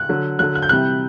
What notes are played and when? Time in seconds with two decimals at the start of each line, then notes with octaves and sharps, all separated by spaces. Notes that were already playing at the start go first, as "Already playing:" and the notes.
Already playing: F#6
0.09 D3 F#3
0.39 D3 F#3 F#6
0.55 F#6
0.62 G6
0.69 C3 E3 G3 F#6